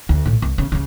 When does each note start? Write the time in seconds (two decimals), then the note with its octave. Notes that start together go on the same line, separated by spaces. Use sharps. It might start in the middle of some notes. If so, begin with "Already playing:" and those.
0.09 D2
0.25 B1 A2
0.42 C2
0.58 C#3
0.72 C#2 C#3